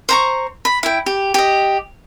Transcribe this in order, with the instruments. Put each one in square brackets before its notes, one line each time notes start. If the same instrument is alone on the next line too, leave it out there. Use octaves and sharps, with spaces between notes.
[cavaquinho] C5 A#5 C#6
B5
E4 G5
G4
G4 D#5